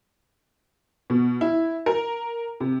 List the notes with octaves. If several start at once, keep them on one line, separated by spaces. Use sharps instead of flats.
B2
E4
A#4
C3